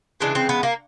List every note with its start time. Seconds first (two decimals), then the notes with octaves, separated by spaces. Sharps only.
0.20 C#3 E3 G#3 D4
0.35 C4
0.49 B3
0.63 A#3